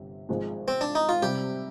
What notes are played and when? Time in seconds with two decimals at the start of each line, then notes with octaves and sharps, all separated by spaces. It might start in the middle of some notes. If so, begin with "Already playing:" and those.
Already playing: G1 C3
0.29 G#1 G#2 F3 G#3
0.68 C4
0.81 D4
0.95 D#4
1.09 F4
1.21 C3 G3 C4 G4